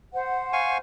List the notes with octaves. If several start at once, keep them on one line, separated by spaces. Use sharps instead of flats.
C5 F#5
F5 G#5 C#6